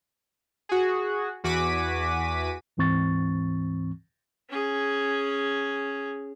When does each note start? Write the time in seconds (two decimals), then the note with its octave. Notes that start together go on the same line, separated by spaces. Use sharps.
0.69 F#4 G#4
1.44 E2 F#4 G#5 D6 B6 D#7
2.77 D2 G#2 E3 C4 C#6 A6
4.49 C#4 G#4